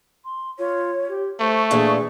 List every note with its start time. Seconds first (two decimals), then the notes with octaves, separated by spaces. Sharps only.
0.25 C6
0.59 F4 C#5
1.09 G4
1.40 A3 C5 C#6
1.71 A#2 E3 D4 G#4